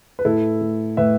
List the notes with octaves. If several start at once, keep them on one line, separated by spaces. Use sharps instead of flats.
B4
A2 E4 A4
A3
A2 B4 E5